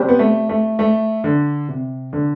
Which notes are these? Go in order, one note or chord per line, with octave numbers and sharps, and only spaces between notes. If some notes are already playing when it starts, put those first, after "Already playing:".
Already playing: C4 G4 C5
B3
A3
A3
A3
D3
C3
D3